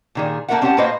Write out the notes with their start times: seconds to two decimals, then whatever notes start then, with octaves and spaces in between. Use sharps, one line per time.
0.15 A#2 D#3 G#4
0.48 A3 A#3 F4 A#4 E5 F#5
0.62 C4 C#4 G4 C#5 F#5 A5
0.77 A2 A#3 F#4 B4 C5 D#5